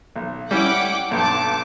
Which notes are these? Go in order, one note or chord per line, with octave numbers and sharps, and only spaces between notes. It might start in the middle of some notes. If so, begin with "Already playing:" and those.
B1
G3 C#4 E4 F#5 G5 D6
B1 G2 A5 D6